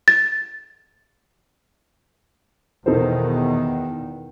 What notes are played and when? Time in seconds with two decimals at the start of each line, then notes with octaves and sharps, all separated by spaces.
0.08 A6
2.86 E2 B2 D#3 D#4 A4 C5